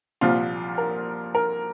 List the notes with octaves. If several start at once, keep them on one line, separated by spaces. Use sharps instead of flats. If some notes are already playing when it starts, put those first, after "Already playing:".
C2 A#2 F3 F4
A#4
A#4